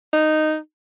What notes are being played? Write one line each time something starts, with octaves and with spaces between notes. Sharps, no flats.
D#4